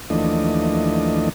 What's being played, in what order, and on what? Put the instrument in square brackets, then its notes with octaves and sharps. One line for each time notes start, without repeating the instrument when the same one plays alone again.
[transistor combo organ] D#2 E3 F3 A3 D4 D#5